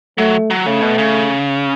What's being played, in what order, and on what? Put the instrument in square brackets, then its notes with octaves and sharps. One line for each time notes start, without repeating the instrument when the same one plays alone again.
[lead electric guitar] F#3 [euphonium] A3
[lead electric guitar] F#3
[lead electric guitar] C#3 [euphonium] A3
[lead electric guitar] B2
C#3